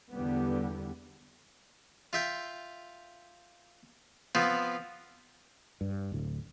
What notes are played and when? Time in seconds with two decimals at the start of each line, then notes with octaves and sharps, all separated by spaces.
0.13 E2 D3 G3 B3
2.13 F4 E5 G5
4.35 F3 B3 C4 F4
5.81 G2
6.12 D1 D2